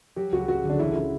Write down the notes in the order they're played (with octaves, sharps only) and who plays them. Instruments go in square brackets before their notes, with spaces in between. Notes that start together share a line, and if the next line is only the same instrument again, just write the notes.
[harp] F#3 [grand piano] G4
[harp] C#2 [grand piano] F#4
[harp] F#3 [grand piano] F#4
[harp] D3 [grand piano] D4
[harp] A1 [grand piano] E4
[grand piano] E4